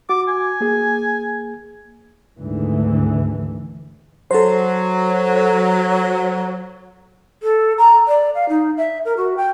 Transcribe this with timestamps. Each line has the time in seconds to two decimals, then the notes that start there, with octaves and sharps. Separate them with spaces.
0.09 F#4 D6
0.28 G#5
0.61 A#3 G#4
2.38 G#1 D2 G#2 D3 E3
4.31 F#3 A4 C5
7.43 A4
7.78 A#5
8.07 D5
8.35 F5
8.49 D#4
8.77 E5
9.05 A#4
9.17 F#4
9.37 G5